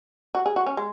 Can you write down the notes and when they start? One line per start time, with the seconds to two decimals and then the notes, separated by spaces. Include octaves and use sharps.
0.35 F#4
0.46 G#4
0.56 F#4
0.67 C#4
0.77 G#3